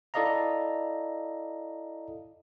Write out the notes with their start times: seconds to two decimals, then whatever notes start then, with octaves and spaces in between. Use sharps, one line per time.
0.14 E4 A4 D5 D#5 F5 A#5